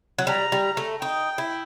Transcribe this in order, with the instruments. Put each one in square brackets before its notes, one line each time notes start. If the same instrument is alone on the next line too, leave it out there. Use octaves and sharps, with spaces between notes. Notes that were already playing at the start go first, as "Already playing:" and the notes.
[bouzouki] F#3
[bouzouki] G3 [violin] A#5
[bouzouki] G3
A3
[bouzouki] D#4 [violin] G5
[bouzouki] E4